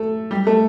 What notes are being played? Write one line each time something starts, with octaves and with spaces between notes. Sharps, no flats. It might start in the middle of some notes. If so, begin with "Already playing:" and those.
Already playing: A3 A4
G3 G4
A3 A4